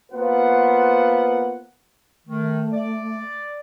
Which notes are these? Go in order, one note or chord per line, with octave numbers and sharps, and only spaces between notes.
A#3 B3 F4 C5 F#5
D#3 A3
D5